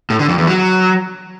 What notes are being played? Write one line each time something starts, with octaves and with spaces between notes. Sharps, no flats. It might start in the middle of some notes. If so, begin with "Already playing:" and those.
A2
D3
F2
E2
F#3